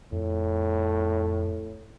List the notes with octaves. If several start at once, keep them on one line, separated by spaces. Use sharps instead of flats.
F2 A2